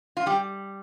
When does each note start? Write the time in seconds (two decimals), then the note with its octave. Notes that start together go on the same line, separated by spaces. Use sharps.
0.17 F4
0.26 G3 G4